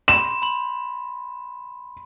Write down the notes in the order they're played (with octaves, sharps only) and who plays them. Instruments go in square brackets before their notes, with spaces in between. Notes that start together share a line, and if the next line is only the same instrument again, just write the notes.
[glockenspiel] B5 C6 [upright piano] E7
[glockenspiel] B5 C6